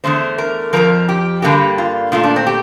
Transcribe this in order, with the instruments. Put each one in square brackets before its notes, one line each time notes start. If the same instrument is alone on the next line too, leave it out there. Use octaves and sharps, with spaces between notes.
[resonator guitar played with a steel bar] E2 D3 A3 C5
A#4
F2 C3 F3 A#4
G4
G2 D3 G3 A#3 G4
F4
A#2 A3 F4
D4
C4
G4